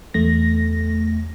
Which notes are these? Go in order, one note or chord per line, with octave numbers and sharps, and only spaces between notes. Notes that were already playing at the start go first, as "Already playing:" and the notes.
E2 A3 A#6